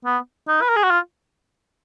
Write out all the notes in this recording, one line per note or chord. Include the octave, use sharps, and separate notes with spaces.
B3
D#4
B4
A#4
G#4
F#4
F4